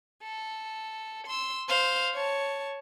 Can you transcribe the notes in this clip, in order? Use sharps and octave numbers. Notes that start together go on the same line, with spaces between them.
A4
C6 E6
C5 F5
C#5 A5